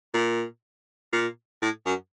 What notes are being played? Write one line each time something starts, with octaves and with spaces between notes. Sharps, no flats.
A#2
A#2
A2
F#2